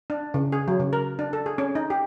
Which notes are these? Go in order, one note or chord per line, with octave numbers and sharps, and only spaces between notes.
D4
C#3
G#4
F#3
C#3
A#4
D4
A4
G#4
C#4
D#4
G4